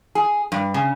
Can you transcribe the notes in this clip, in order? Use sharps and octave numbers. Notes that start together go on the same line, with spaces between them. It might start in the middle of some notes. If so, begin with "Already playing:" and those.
G#4
G2
C#3